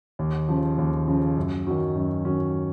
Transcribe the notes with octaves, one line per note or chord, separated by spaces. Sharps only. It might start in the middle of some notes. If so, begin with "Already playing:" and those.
D#2
C#3 F3
D#2
C#3 F3
F#2
D#3 F#3 C#4
F#2
D#3 F#3 C#4